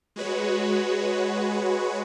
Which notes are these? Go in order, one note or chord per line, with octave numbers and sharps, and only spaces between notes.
G#3 F#4 B4 C#5